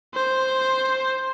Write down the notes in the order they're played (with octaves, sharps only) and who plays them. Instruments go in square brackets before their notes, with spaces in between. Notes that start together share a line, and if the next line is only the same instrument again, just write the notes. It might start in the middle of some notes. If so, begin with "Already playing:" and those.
[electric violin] C5